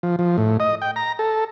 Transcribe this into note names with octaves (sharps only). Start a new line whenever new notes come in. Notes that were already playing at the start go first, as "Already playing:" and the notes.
F3
F3
A2
D#5
G5
A#5
A4